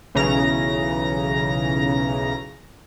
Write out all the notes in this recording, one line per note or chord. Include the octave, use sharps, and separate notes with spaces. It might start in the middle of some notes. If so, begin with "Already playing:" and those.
B1 C#3 E3 A#5 A#6